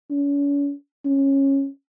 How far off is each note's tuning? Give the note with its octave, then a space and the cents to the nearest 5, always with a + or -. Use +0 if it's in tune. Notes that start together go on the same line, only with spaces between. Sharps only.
C#4 +40
C#4 -15